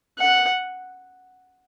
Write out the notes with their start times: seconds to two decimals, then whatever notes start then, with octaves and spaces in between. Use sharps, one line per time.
0.19 F#5